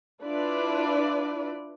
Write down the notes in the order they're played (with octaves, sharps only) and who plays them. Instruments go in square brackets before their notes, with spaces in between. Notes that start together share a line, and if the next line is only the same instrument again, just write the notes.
[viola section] D4 E4 F4 B4 D5